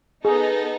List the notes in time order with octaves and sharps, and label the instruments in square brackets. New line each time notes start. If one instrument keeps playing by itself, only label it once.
[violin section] B3 D#4 A4 [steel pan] G#4